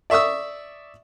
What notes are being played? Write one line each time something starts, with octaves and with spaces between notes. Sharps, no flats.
D5 E5 C#6 D#6 E6